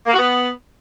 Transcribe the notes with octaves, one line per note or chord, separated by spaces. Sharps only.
A#3
F#4
B3